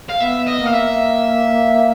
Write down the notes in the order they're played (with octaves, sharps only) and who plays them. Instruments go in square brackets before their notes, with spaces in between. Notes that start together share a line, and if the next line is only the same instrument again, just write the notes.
[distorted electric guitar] F5
[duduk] B3 [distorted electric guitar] E5
[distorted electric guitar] D#5
[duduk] A#3
[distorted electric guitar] F5
E5